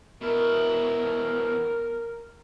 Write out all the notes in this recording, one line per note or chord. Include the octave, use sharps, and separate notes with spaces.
B2 E4 A#4